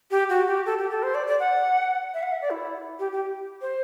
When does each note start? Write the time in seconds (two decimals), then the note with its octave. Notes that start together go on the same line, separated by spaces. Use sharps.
0.11 G4
0.29 F#4
0.48 G4
0.66 A4
0.79 G4
0.91 A4
1.03 C5
1.15 D5
1.27 D5
1.40 F#5
2.14 E5
2.23 F#5
2.32 E5
2.42 D5
2.50 E4
2.99 G4
3.12 G4
3.62 C5